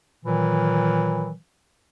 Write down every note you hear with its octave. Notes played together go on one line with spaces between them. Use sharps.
A#2 D#3 E3 F#3